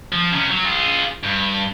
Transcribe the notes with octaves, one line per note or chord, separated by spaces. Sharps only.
F3
C3 C#4
F#3
F4 G#4
G2